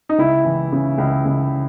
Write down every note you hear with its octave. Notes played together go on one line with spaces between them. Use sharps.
D#4
C#2 E4
E3
C#3
C#2
C#2